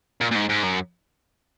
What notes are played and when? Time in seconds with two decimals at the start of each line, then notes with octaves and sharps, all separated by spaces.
0.21 A#2
0.31 A#2
0.35 G#2
0.49 G#2
0.63 F#2